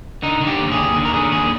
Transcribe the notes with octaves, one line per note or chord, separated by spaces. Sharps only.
D3 D#4
D3
G4
D#2
G#4
D#2
D3
A#4
D3 G#4
D#2 G#4